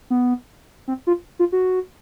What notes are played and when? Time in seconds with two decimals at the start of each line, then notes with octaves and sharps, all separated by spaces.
0.10 B3
0.88 C4
1.07 F4
1.39 F4
1.52 F#4